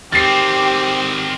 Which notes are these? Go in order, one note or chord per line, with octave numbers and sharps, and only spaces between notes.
D#3 C4 G4 A6 C7